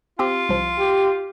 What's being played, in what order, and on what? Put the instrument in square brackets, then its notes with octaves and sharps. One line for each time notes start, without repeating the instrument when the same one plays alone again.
[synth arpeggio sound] C4 G4 [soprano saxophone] F4
[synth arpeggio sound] C2 F3
[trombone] G4